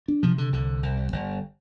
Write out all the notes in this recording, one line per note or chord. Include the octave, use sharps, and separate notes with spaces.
D4
C3 F3
D3
C2 D3
C2
G1